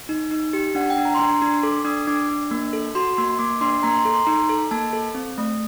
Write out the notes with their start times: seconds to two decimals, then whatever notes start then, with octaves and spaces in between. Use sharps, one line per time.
0.09 D#4
0.31 D#4
0.53 G4
0.75 D4 F#5
0.90 G5
0.98 D4
1.05 A#5
1.15 C6
1.19 D4 A#5
1.42 D4 C6
1.63 A4 D6
1.85 D4 D#6
2.07 D4 D6
2.29 D4
2.51 A#3
2.73 A4
2.95 F#4 C6
3.17 A#3 C6
3.39 A#3 D6
3.61 D4 C6
3.83 A#3 A#5
3.94 C6
4.03 A4 A#5
4.14 C6
4.25 D#4 A#5
4.49 A4
4.71 A#3 A5
4.93 A4
5.15 C4
5.38 A3